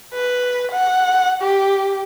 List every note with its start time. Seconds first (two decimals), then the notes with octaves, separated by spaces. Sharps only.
0.14 B4
0.72 F#5
1.42 G4